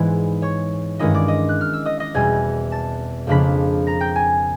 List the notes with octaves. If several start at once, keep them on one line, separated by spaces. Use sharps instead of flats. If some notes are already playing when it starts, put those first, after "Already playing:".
Already playing: G#2 E3 G#3 B3 E4 D5
C#5 C#6
G2 D#3 G#3 C#4 E4 D#5 D#6
D5 D6
D#5 D#6
F#6
F6
E6
D#5 D#6
D#5 D#6
E2 B2 G3 C4 G#5 G#6
A5 A6
F2 C#3 F3 A#3 D4 B5 B6
A#5 A#6
G5 G6
G#5 G#6